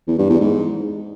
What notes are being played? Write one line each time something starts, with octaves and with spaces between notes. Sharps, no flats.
E2
G2
E2
G#2